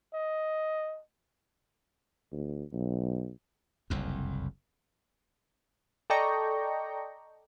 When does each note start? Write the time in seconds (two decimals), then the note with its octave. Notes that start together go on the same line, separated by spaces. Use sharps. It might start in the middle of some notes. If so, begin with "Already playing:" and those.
0.14 D#5
2.32 D2
2.73 B1
3.90 F#1 C2 F2
6.10 A4 D5 D#5 G5 A#5 C#6